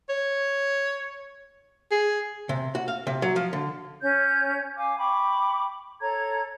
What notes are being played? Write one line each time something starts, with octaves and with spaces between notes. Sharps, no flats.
C#5
G#4
C3
F#4
F5
C3
F#3
F3
D3
C#4 C#5 G6
F5 G#5 D6
G5 B5 C#6 D6
A4 C#5 A#5 G#6